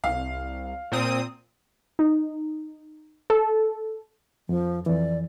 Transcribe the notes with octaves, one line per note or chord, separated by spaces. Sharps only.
C2 F5
A#2 C4 D#6
D#4
A4
F2 F3
F2 E3 D5